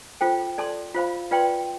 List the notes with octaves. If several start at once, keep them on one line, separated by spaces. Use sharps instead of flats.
F4 A4 C5 G5
A4 D5 A5 C6
F4 C5 F5 B5
F4 B4 D5 G5 C6